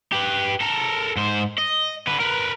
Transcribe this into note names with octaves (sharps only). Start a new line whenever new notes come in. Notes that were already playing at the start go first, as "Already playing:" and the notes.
G4 B4
A4 A#4
G#2 C5
D#5
D3 B4
A#4 B4